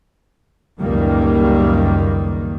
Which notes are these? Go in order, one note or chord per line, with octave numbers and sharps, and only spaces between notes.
C#2 F#2 D#3 G3 A#3